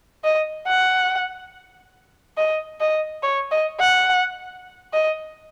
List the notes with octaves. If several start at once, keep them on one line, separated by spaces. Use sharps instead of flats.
D#5
F#5
D#5
D#5
C#5
D#5
F#5
D#5